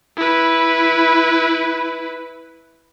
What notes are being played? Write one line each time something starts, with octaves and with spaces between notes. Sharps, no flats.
E4 B4